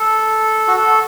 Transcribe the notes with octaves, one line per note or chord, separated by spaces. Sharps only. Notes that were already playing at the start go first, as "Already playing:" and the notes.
Already playing: A4
F#4
A4